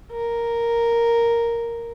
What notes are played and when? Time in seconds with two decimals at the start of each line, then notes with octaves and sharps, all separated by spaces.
0.12 A#4